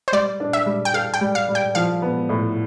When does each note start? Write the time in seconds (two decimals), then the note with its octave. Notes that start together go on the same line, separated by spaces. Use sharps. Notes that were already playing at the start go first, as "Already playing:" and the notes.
0.08 C5
0.12 G3 D5
0.40 D4
0.53 E5
0.66 G3
0.85 G5
0.94 A4 F5
1.14 G5
1.21 G3
1.35 F5
1.49 G3
1.55 G5
1.75 F3 F5
2.02 B3
2.29 A2